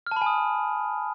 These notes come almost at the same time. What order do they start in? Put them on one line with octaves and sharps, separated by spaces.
F6 A5 B5 G#5 D#6